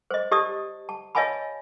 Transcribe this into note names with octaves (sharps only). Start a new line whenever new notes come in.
C5 D#5
G4 D5 D#5 A5 D#6
A5
C#5 D#5 F5 G#5 A5 B5